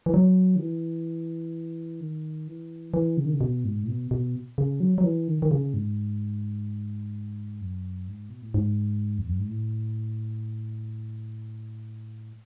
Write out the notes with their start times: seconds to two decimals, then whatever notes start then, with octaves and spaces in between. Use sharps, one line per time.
0.06 E3
0.14 F#3
0.56 D#3
0.60 E3
2.00 D#3
2.48 E3
2.94 E3
3.17 C#3
3.26 D#3
3.33 C#3
3.41 B2
3.65 G#2
3.83 A2
3.88 B2
4.11 B2
4.58 C#3
4.80 F#3
4.98 F#3
5.04 E3
5.28 D#3
5.42 D#3
5.51 C#3
5.74 G#2
7.61 F#2
8.08 G#2
8.29 B2
8.42 A2
8.54 G#2
9.19 E2
9.29 F#2
9.39 G#2
9.48 A2